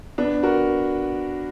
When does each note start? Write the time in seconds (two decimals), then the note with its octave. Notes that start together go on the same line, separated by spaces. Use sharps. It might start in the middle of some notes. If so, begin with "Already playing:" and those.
0.18 B3 D4
0.43 F#4 A#4